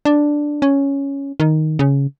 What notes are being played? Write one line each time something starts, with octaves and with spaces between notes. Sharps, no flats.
D4
C#4
D#3
C#3